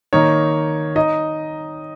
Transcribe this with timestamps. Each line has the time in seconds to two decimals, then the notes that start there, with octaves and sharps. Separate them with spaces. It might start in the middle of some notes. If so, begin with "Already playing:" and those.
0.13 D#3 A#3 D#4 C#5
0.96 D#4 D#5